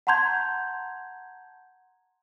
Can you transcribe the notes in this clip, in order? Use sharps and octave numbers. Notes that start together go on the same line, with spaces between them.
F#5 A5 A#5 C6 G6 G#6